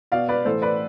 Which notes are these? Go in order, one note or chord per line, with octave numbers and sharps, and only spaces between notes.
B2 D5 F5
B4 D5
A2 E3 A4 C5
B4 D5